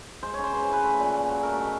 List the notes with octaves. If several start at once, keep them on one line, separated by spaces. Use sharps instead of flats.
G#3 C5
C#3 C#5
C5
C#3 B4
C5
E3 B4
A3
A#2
A#2
F#3
A3 A#4
B2